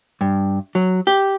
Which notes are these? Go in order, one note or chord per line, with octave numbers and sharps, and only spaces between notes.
G2
F#3
G4